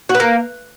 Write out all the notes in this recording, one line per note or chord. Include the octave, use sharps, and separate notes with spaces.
F#4
B4
A#3